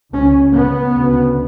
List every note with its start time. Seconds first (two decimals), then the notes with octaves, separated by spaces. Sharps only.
0.13 C#2 C#3 C#4
0.55 B3
0.95 D2 C#3